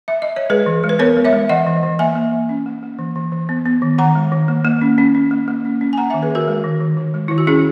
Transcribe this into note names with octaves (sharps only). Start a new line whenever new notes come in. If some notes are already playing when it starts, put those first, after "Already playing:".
E5
D#5
C#5
G#3 G#4 B4
E3
G#3
B4
B3 A#4 C#5
G#3
C#5 E5
G#3
E3 D#5 F#5
E3
E3
A#3 E5 G#5
A#3
E3
C#4
A#3
A#3
E3
E3
E3
B3
B3
D#3
D#3 F#5 A#5
G#3
D#3
A#3
A#3
C#4
C#4
C#4
A#3
A#3
C#4
C#4
G#5
A#3 F#5 A#5
D#3 E5 G#5
G#4 B4
D#3 F#4 A#4
G#3
D#3
D#3
D#3
G#3
D#3 E4
F#4
C#4 E4 G#4